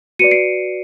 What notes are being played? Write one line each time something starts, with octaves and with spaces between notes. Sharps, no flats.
F#4 B4 D5 C#7 D#7
C7 D7